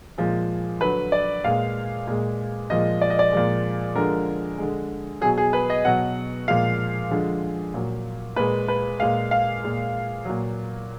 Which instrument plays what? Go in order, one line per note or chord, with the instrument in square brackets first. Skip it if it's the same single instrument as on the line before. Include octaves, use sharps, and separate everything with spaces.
[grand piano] A#2 F3 G#3
D3 F#3 B4
D5
A#2 G#3 F5
A#2 G#3
A#2 F3 G#3 D#5
D5
D#5
D5
A#2 F3 G#3
D3 F3 G#3 A#4
D3 G#3
B2 F#3 G#4
G#4
B4
D#5
B2 F#3 F#5
A#2 F3 G#3 F5
D3 F3 G#3
A#2 F#3
A#2 G#3 B4
B4
A#2 G#3 F5
F5
A#2 G#3
A#2 F#3